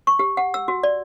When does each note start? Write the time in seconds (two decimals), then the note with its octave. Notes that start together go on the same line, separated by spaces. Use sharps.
0.07 C#6
0.19 G4
0.37 F#5
0.54 E6
0.68 F#4
0.83 D5